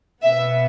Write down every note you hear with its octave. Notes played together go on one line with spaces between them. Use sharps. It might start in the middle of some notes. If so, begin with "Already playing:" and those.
B2 B3 E5